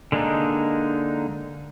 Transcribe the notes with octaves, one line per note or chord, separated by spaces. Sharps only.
D3 G#3 A#3 D4 D#4